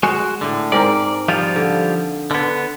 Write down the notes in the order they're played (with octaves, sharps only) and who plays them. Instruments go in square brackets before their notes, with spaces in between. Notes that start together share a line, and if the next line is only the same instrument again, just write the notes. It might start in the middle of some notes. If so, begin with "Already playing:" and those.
[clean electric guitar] G#3 F#4
A2 D3
[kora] G#2 C4 A#4 [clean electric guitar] D5
[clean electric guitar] F3 G3 F4
[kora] D3
[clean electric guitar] D3 B3